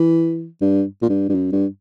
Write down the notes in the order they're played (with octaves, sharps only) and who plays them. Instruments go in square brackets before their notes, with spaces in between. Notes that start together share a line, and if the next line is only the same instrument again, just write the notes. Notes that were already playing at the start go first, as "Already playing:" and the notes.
Already playing: [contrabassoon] E3
G2
A#2
G2
G2
F#2
G2